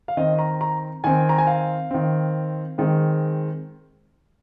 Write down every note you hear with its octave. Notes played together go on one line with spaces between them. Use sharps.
F5
D#3 C4 D#5
A#5
A#5
D#3 C4 G#5
A#5
G#5
F5
D#3 C4
D#3 G#3 C4